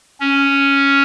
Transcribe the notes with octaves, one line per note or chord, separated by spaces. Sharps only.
C#4